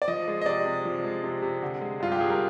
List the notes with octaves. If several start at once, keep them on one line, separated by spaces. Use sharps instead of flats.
D5
F3 D#5
G#3
D#5
C3 D5
C3
F3
G#3
C3
C3
D3
G#3
G2 F4
G4
G2 G#4
A#4